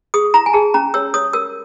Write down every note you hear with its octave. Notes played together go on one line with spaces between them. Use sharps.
G#4 D#6
E4 A#5
G#5
G#4 A5
C#4 A#5
C#5 E6
C#5 D#6
A#4 E6